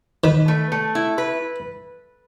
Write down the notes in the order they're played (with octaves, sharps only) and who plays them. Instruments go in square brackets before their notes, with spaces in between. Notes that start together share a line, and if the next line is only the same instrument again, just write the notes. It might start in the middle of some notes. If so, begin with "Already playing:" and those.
[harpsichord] D#3 [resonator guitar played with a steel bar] B4
[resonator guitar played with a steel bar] A3
A3
E4
B4